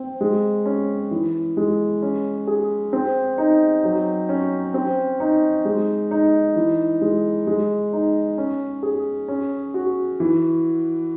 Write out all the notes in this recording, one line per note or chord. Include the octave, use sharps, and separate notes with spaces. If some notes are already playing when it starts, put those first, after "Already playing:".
Already playing: C4
G#3
C#4
E3
G#3
C#4
G#4
C4
D#4
F#3
C#4
C4
D#4
G#3
D#4
E3
G#3
G#3
D#4
C#4
G#4
C#4
F#4
E3